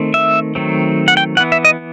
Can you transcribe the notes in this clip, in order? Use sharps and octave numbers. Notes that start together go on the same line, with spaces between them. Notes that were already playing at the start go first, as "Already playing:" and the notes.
Already playing: D#3 A3 C4
E5
D#3 F#3 A3 C4
F#5
G5
E3 B3 F#5
E5
D#5